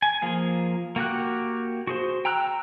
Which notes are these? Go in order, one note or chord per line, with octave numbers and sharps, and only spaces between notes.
G#5
F3 A#3 G#4
A#3 F#4 G4 F#6
F#4 G#4 C5
G5 A#5 E6 F#6